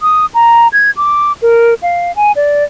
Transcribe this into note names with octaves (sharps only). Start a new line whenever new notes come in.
D#6
A#5
G#6
D6
A#4
F5
G#5
D5